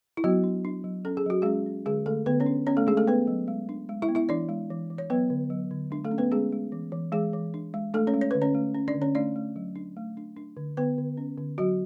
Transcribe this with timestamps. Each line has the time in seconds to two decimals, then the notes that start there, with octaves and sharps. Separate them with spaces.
0.17 E4
0.24 F#3 B3 F#4
0.44 D4
0.65 D4
0.84 F#3
1.05 C#4 A4
1.17 G#4
1.26 F#3 F#4
1.42 G#3 C#4 G#4
1.66 C#4
1.86 D3 G#3 G#4
2.06 D3 A3 A4
2.26 D3 B3 B4
2.40 C#4 C#5
2.46 D4
2.67 B3 C#4 C#5
2.77 A3 A4
2.87 G#3 D4 G#4
2.97 A3 A4
3.07 B3 B4
3.27 F#3
3.48 G#3
3.69 D4
3.89 G#3
4.02 E4 E5
4.09 B3
4.15 E4 E5
4.29 E3 D4 D5
4.49 G#3
4.70 E3
4.90 E3
4.98 C#5
5.10 F#3 B3 B4
5.30 D3
5.50 F#3
5.71 D3
5.91 G#3 D4
6.05 A3 A4
6.11 C#4
6.18 B3 B4
6.31 G#3 C#4 G#4
6.52 G#3
6.72 E3
6.92 E3
7.12 E3 G#3 G#4
7.33 E3
7.54 D4
7.74 G#3
7.94 A3 D4 A4
8.07 C#4 C#5
8.14 G#3
8.21 C#5
8.31 D3 B4
8.42 C#4 C#5
8.54 A3
8.75 C#4
8.88 D4 D5
8.95 D3
9.02 C#4 C#5
9.15 A3 D4 D5
9.36 A3
9.56 F#3
9.76 D4
9.97 A3
10.17 D4
10.37 D4
10.57 D3
10.77 D3 B3 B4
10.98 D3
11.17 C#4
11.38 D3
11.58 F#3 F#4